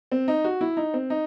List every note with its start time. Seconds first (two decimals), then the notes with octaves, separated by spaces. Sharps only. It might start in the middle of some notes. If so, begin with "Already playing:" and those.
0.12 C4
0.28 D#4
0.44 F#4
0.61 E4
0.77 D#4
0.94 C4
1.10 D#4